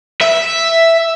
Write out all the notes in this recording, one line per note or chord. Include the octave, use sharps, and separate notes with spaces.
E5